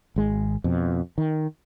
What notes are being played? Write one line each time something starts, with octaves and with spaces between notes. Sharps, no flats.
G#1 G#3
F2 B2
D#3